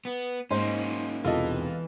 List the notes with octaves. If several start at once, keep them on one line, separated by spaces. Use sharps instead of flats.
B3
G#2 A#3 C#4 D#4 C5 D#5 C6
E1 C2 E3 F4 A4 D#5